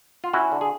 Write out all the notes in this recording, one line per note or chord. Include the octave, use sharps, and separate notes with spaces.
F4
C#4 E4 F#4
D3
G#4